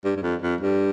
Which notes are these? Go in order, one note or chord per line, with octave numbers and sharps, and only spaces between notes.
G2
G2
F2
F2
G2